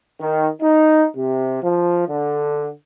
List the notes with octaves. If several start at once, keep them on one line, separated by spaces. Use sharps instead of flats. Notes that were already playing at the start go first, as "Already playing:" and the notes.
D#3
D#4
C3
F3
D3